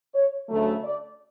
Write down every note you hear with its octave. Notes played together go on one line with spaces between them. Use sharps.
C#5
D2 C#3 F#3 A3
D5